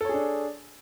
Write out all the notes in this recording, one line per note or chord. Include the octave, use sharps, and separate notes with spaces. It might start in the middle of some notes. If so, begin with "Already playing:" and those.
D4 G#4 A4 C#5